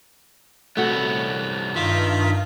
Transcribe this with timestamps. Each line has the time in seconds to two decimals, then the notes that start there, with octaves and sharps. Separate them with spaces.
0.77 C2 A3 B3 F#4
1.75 G2 D#3 F4 E5